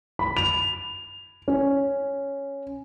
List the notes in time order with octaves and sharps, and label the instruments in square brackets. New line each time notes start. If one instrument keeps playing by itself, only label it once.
[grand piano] B5
F7
C#4